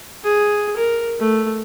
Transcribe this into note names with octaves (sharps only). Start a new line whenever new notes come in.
G#4
A#4
A3